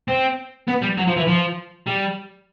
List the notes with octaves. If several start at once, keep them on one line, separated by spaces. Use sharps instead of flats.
C4
B3
G3
F#3
F3
E3
F3
G3